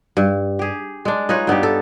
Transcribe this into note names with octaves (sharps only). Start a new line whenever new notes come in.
G2
G4 G#4
G#3 D4
D#4 F4 B4 C#5
G2 B3 D#4 G4
A4